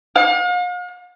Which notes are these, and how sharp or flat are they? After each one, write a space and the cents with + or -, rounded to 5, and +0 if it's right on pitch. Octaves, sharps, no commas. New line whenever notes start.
F5 +45